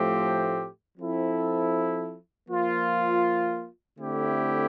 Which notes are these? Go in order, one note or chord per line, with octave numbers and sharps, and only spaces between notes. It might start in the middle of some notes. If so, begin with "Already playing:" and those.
Already playing: A2 F3 A3 C4 G4
F3 C4 E4 A4
F3 A#3 F4
D3 A3 C4 E4 G4